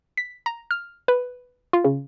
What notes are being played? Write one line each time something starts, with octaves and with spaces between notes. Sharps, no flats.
B6
A#5
F6
B4
F4
C#3